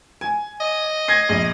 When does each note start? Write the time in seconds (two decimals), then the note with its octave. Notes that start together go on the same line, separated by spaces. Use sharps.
0.21 G#5
0.61 D#5
1.08 G#6 A#6 C7
1.29 A#1